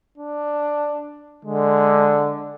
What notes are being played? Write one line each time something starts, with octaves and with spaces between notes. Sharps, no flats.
D4
D3 G#3